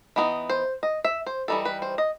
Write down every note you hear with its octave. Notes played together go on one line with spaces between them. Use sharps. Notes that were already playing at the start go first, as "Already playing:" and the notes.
E3 B3 D#4
C5
D#5
E5
C5
E3 G3 D#4 A4
B4
C5
D#5